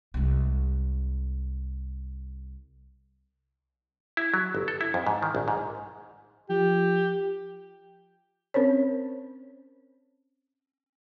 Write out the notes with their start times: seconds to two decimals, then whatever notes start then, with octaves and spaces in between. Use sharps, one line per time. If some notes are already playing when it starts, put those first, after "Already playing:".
0.14 C2 G#3
4.17 E4
4.34 F#3
4.55 G1
4.68 A4
4.81 E4
4.94 F2
5.07 G#2
5.22 D#3
5.35 A#1
5.48 G#2
6.50 F3 G4
8.54 C4 C#4 A#4 C5 C#5